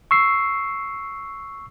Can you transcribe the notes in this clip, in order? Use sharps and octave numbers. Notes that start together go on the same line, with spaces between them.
C#6 E6 C7